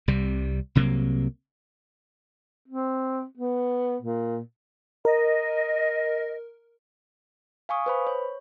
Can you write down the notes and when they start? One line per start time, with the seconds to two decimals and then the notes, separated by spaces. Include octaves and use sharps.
0.08 C2 C3 G3
0.75 C2 C3 F#3 A#3
2.68 C4
3.38 B3
4.02 A#2
5.05 A#4 D#5
7.69 F5 G#5 C#6 D#6
7.86 B4 C5 B5
8.07 C#5